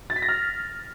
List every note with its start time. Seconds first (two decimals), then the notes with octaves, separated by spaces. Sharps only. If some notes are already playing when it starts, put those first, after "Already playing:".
0.10 A6
0.16 B6
0.22 A#6
0.29 F6